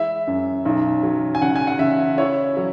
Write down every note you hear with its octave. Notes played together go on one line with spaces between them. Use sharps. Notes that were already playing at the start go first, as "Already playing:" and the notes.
Already playing: G#3 E4 E5
F#2
B1
F#3
G#5
C#3 F#5
G#5
F#5
C#3 E5
E4 C#5
F#3